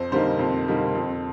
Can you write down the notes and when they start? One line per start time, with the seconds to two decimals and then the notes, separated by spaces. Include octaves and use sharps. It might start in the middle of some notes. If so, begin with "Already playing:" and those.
Already playing: F2 C5
0.12 D3 G3 A#3 D#4 C5
0.39 F2
0.68 D3 G3 A#3 D#4
0.95 F2